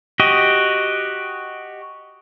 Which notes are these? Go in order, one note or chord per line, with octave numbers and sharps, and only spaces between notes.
F#4 G4 D#5